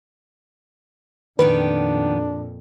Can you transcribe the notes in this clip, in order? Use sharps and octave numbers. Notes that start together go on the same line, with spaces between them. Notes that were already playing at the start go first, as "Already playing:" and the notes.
F2 A#2 D#3 B3 D4 G4 B4